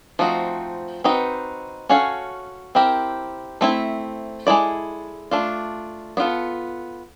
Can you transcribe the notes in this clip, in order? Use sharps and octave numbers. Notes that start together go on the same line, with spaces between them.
F3 A3 C4 D#4 F#4
C4 D#4 F#4 B4
C#4 F#4 A4 C#5 F5
C4 E4 G4 A#4
A3 C4 E4
G#3 C4 E4 A4 D5
A3 D4 F4
B3 D4 F4 A4